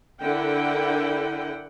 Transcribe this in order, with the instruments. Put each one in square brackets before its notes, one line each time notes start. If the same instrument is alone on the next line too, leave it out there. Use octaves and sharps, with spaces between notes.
[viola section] D3 E4 A#4 F#5 G5